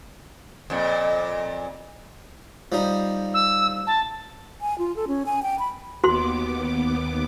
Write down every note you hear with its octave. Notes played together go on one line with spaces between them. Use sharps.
F2 A#2
F3 G3 D#4
E6
A5
G#5
F4
A4
C#4
G#5
G5
B5
D#2 B3 F#4 C6 D6